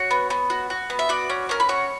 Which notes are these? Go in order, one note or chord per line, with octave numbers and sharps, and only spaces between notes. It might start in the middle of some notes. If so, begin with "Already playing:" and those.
Already playing: F#4 C#5
B3
B3
F#4
F#4
B3
E5
F#4 D5
C#4
C#4 A#4
B4
F#4 C#5